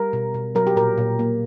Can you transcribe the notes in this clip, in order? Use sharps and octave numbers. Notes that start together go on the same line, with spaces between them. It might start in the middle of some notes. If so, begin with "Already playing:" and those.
Already playing: G3 A#4
B2
B2
F#3 A#4
G4
A#2 A#4
A#2
A#3